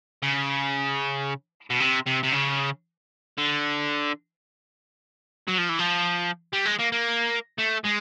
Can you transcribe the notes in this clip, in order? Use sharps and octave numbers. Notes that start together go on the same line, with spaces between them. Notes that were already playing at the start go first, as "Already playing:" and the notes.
C#3
B2
C3
C3
C3
C#3
D3
F#3
F3
E3
F3
G3
G#3
A#3
A#3
A3
G#3